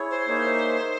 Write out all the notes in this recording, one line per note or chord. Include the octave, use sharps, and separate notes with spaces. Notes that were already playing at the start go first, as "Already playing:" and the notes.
Already playing: E4 G#4 C#5
C5
A#3 D#4 G#4 C#5 E5